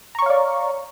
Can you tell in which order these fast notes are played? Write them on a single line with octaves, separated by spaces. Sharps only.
A#5 C#6 C#5 F5 D5